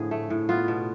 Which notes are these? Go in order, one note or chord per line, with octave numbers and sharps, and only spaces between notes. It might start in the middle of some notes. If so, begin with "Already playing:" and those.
Already playing: A2 D3 F3 G#4
A3
A2
B3 F4
B2